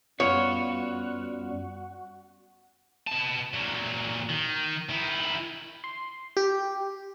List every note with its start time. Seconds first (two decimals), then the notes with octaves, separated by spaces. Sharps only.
0.20 F#2 G3 B3 F4 F#4 C#5
3.08 B2 A5
3.54 A#2 F#3
4.29 D#3
4.89 D#3 E4
5.84 C6
6.37 G4